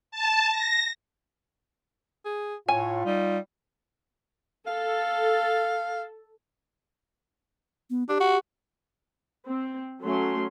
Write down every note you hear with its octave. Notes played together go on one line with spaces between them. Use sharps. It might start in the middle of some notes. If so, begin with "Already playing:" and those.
A5
A#6
G#4
A2 F4 C#5 G#5
G3 D#4
A4 F5
B3
D4 G4
F#4
C4
F#3 A3 C#4 C6